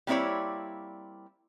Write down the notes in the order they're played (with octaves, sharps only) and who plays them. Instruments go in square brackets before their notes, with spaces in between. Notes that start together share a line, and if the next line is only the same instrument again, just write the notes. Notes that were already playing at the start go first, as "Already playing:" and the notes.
[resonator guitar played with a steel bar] G3 A#3 C4 E4 C#5 D5